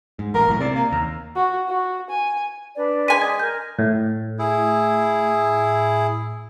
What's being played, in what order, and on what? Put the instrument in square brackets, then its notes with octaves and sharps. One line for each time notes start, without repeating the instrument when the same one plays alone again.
[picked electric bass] G#2
[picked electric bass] A1 [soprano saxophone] A#4
[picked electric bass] B1 A2
[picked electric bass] C3 [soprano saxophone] D5
[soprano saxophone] A#3
[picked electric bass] D#2 [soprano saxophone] A#5
[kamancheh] F#4
F#4
G#5
[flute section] D4 B4 D5
[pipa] G#3 G#5 [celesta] B6 D#7
[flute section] D5 D#6 [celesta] G#6
[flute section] A#4 [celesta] G6
[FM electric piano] A2
[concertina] E4 G#4